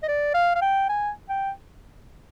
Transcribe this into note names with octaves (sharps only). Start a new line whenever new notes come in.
D#5
D5
F5
F5
G5
G#5
G5